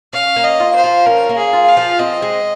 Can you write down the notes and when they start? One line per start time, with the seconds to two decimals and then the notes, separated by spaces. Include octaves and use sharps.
0.13 C#4 F5
0.36 A#3
0.44 D#5
0.60 F4
0.76 C5
0.84 F3
1.06 C#4 A#4
1.29 A#3
1.38 G#4
1.53 F4
1.69 F5
1.77 F3
1.99 C4 D#5
2.22 G#3